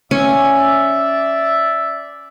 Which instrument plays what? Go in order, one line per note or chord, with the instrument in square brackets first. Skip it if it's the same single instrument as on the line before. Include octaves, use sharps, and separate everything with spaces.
[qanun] C#4 [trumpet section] D5 E5